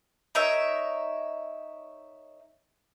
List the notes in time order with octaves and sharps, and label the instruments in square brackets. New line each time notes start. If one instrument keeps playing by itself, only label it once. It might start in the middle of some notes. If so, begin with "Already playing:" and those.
[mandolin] D#4 A#4 C#5 E5